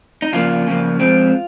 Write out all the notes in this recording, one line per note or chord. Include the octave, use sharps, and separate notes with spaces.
D#4
C#3 F3 A#3 F4
C#3 F3 A#3
F3 G#3 C4